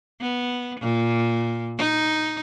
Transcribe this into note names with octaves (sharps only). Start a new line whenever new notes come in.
B3
A#2
D#4